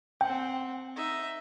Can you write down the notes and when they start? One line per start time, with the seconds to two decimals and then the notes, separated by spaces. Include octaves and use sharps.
0.21 C4 F#5 G5
0.96 D#4 E5